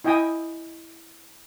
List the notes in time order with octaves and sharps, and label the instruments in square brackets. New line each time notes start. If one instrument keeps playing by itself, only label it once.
[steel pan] E4 D#5 G5 G#5 D#6